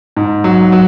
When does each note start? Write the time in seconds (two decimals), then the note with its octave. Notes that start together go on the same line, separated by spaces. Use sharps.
0.16 G#2
0.44 F#3
0.72 F#3